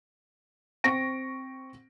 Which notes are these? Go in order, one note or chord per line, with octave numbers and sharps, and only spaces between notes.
C4 C#6 A#6 D7